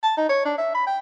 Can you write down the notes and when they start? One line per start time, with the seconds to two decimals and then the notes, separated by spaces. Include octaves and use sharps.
0.03 A5
0.17 D#4
0.29 C#5
0.45 D4
0.58 E5
0.74 B5
0.87 G5